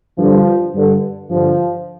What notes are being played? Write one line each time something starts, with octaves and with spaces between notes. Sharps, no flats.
G2 D3 F3
G2 D3
G2 D3 F3